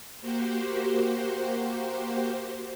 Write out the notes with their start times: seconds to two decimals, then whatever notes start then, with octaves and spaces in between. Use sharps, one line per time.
0.21 A#3 F#4 G4 C5